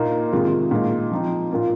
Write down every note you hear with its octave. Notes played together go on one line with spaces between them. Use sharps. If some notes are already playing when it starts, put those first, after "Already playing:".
Already playing: A#2 A#3 D#4
C3 D#3 G#3 F4
A#2 G#3 D#4
F3 C4 D#4
A#2 A#3 F4